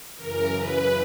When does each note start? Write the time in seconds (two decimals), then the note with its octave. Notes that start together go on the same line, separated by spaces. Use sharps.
0.17 F#2 C#3 E3 A#4
0.57 B4